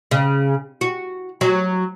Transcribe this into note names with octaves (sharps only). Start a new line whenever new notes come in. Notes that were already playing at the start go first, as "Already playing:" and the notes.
C#3
F#4
F#3